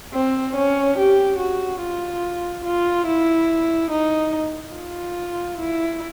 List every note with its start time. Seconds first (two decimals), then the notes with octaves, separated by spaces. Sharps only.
0.14 C4
0.56 C#4
0.98 G4
1.39 F#4
1.82 F4
2.64 F4
3.07 E4
3.91 D#4
4.75 F4
5.59 E4